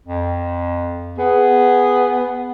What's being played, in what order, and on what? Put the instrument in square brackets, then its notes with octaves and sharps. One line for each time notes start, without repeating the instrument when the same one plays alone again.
[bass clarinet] F2
[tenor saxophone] B3 [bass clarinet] G#4